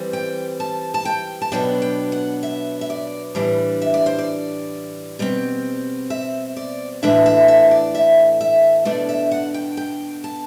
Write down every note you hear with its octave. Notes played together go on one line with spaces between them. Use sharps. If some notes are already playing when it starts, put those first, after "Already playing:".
Already playing: E3 G3 C4
G5
A5
A5
G5
A5
B2 F#3 B3 D4 G5
G5
F#5
E5
E5
D5
A2 E3 G3 D4
E5
D5
C5
D5
B2 G3 C4
E5
D5
A2 E3 A3 D4 E5
E5
E5
C5
D5
E5
E5
B2 A3 D4 D5
E5
F#5
G5
G5
A5